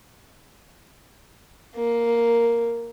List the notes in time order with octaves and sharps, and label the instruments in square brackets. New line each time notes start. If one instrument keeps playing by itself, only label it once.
[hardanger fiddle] A#3